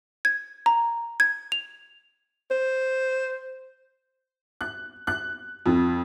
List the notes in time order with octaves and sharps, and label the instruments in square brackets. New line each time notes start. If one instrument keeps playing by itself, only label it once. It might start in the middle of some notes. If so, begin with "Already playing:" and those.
[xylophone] G#6
A#5
G#6
F7
[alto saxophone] C5
[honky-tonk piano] F#6
F#6
F2